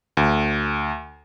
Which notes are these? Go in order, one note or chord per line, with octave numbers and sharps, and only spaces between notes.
D2